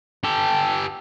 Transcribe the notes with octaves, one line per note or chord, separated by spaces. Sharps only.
G4 A4